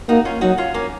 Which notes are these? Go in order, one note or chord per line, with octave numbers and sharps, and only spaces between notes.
A#3 D#4 F#4
C#4 F4
F#3 D#4 F#4
C#4 F4
A#3 C#4